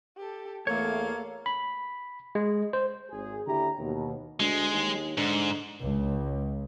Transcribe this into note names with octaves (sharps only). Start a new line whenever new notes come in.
G4 A4
E2 A3 A#3 A4 C#5 F5
B5
G#3
C5
G#1 G#4
D#2 D3 E4 G4 A#5
D#2 B2
D2 G#3
D#2
G#2 D3
C#2